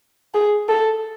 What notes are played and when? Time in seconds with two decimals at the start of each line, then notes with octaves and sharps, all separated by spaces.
0.34 G#4
0.69 A4